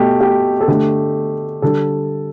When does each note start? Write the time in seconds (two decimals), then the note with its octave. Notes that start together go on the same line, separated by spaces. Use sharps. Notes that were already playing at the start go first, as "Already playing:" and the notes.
Already playing: B2 A3 G4
0.21 G4
0.60 A4
0.68 D3 A3 G4
1.62 D3 G3 A4